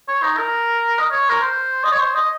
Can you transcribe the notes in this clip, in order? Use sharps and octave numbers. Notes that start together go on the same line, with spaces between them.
C#5
D#4
A#4
D#5
C#5
A#4
C5
D#5
C#5
C5
D#5